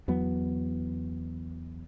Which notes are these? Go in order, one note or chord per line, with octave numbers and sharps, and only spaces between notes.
E2 F#3 B3